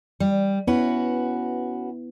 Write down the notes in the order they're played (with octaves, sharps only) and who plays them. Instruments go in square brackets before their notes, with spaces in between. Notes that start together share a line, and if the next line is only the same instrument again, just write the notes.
[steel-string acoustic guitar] G3
[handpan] B3 E4 [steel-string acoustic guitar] C#4 F#4 B4